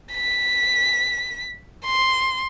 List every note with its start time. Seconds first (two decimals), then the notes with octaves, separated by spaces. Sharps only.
0.13 B6
1.86 C6